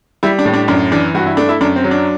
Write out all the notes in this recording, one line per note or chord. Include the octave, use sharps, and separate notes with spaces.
G3 E4
D4
A2
D4
F#2 D4
E3 D4
G2 F#4
E4
A3 D4
E4
F#2 D4
C4
F#3
D4